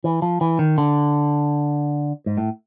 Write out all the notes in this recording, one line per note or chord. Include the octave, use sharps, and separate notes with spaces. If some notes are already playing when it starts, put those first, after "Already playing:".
E3
F3
E3
D#3
D3
G#2
A2